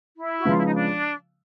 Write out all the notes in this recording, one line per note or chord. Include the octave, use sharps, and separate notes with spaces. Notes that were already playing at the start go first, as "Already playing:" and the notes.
E4
F#4
C#3 F3 G#3 B3 F4
E4
D#4
D4